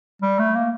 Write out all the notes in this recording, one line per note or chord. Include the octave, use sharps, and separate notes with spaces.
G3
A3
A#3